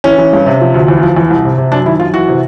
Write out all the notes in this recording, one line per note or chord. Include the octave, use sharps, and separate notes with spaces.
E3 C#4
E3
G2
C3
F3
D2
E2
F3
E2
C2
C3
C3
F#2 D4
D#3 E4
F#2 F4
E3 F#4
C3